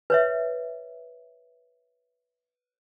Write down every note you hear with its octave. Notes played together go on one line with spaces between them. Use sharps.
B4 C#5 E5